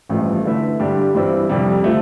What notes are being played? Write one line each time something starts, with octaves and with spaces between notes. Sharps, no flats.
A1 G2 F3 A3
D3 A3 E4 B4 E5
G2 D3 G3 D4 G4
G2 E3 G3 C4 E4
F2 C3 G3
D3 F3 A3